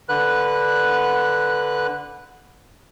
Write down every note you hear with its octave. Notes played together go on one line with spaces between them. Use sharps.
D3 B4 F#6